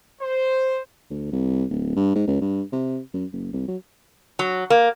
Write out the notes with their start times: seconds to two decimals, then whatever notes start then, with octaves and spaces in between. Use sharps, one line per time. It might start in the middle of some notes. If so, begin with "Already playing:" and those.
0.22 C5
1.10 D2
1.32 C2
1.70 D1
1.96 G2
2.15 G#2
2.27 C#2
2.42 G2
2.73 C3
3.14 F#2
3.33 F#1
3.53 C2
3.68 F#3
4.39 F#3
4.70 A#3